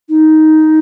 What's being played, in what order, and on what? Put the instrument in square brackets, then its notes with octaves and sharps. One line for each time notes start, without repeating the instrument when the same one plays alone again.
[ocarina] D#4